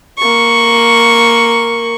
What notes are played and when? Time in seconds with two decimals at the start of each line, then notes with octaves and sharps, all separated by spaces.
0.19 A#3 C#6